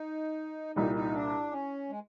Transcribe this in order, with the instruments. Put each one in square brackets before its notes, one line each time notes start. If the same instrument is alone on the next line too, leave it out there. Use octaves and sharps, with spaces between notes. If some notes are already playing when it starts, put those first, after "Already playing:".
Already playing: [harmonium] D#4
[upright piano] C2 A#2 G3 [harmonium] D#4
[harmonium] D#4
D4
C#4
G#3